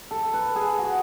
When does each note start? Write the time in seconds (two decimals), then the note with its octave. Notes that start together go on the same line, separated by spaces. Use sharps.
0.11 A4
0.34 B4
0.56 G#4
0.78 F#4